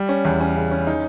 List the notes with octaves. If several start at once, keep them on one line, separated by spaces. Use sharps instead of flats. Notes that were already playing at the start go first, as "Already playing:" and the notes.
Already playing: G3
C#4
E2
C#4
C#3
C#4
D#4